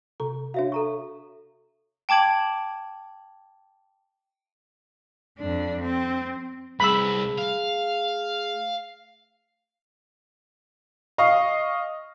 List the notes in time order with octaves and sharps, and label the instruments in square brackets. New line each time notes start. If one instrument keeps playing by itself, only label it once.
[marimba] C3 A4 A#5
[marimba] D4 F#4 [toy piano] C#5 E5 F5
[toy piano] A4 A#5 C#6
[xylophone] G5 A5 D6 G#6 F#7
[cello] F2 D4
C4
[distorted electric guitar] C2 [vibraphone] A3 G#4 [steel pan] B5 E6
[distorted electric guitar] F5
[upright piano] D#5 F5 C#6